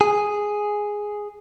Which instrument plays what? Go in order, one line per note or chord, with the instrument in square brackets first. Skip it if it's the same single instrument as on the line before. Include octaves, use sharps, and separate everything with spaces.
[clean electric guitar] G#4